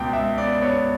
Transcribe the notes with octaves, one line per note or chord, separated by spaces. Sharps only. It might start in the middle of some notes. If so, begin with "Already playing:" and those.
Already playing: C#2 B2 G5
C#2 E5
B3 D5
B3 C#5